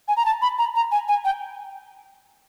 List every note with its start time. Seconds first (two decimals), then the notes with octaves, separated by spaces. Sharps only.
0.08 G#5
0.17 A#5
0.26 A5
0.42 B5
0.59 A#5
0.75 A#5
0.92 G#5
1.08 G#5
1.25 G5